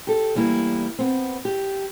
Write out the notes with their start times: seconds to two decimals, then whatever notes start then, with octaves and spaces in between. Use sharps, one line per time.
0.07 G4 A4
0.35 E2 G3 A#3 E4
0.99 B3 C4
1.45 G4